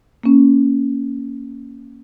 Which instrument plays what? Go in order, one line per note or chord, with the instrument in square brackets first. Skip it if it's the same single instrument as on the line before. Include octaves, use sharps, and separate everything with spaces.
[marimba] A#3 C#4